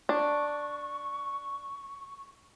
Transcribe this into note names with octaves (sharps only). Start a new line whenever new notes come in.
D4 C#6